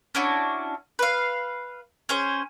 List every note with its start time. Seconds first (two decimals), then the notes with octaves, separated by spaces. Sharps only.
0.15 C#4 D4 E4 F#4
0.99 B4 F5
2.09 C#4 G#4 C5